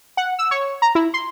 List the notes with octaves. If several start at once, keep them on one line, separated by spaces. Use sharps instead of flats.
F#5
E6
C#5
A#5
E4
C6